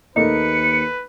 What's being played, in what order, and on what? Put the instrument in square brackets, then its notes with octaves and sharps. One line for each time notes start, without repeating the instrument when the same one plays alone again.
[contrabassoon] D#2 [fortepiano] A3 A#3 D#4 [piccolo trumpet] B4 [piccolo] C#7